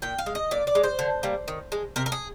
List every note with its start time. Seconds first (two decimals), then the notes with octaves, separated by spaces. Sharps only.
0.02 A#2 G5
0.18 F5
0.26 G#3
0.35 D#5
0.51 A#2 D5
0.67 D5
0.75 G#3
0.83 C5
0.99 D3
1.23 G3 A#3
1.48 D#3
1.72 G#3
1.96 C3 A#4
2.06 A#4
2.12 G#4